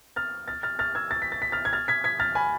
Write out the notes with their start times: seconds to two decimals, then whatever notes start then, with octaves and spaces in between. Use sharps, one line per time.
0.16 F6 A6
0.48 F6 A6
0.63 F6 A6
0.79 F6 A6
0.95 E6 G#6
1.11 A6
1.22 B6
1.32 A6
1.42 B6
1.52 F6 A6
1.65 G#6
1.73 F6 A6
1.88 G#6 B6
2.04 G#6 B6
2.20 F6 A6
2.35 G#5 B5